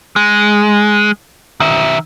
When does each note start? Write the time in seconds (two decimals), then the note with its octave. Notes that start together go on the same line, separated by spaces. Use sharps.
0.16 G#3
1.60 D#3 E5